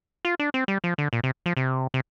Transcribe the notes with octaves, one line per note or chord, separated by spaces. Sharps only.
F4
D4
C4
G3
F3
D3
A#2
C3
F3
C3
C3